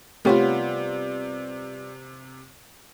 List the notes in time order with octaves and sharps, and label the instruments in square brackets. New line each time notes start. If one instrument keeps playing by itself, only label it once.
[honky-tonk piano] C3 [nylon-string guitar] G3 B3 F4 [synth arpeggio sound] A3 G4 C#5